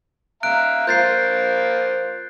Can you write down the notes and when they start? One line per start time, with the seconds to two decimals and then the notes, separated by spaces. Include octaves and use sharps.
0.43 E5 F5 A#5 F#6 D7
0.87 A#3 F4 C5 G6 A6 C7